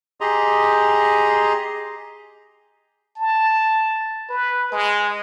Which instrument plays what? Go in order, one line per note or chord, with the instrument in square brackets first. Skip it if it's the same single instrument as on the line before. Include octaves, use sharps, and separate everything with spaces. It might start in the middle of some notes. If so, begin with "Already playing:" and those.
[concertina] G4 G#4 D#5 A#5 C6
[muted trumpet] A5
B4
G#3